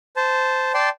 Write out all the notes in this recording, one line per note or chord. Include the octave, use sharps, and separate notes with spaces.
C5 A5
D5 G5 A5 C6